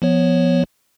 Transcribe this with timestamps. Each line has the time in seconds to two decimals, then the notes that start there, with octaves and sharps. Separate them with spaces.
0.02 F3 B3 C#5